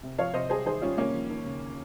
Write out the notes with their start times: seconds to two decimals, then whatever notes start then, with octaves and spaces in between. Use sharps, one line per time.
0.03 C3
0.18 F3 C#5 F5
0.34 C3 C5 D#5
0.50 G3 G#4 C5
0.66 D#3 G#4 C5
0.82 G3 C#4 F4
0.98 C3 A#3 C#4
1.14 F3
1.30 D#2
1.46 C#3